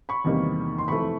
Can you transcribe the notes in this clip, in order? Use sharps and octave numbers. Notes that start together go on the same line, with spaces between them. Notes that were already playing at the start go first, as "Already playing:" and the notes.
B5 C#6
E2 C3 D#3 G3 A#3
C6
F2 C3 E3 A3 B5 C#6